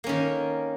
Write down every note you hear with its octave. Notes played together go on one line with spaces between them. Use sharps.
D#3 A#3 C#4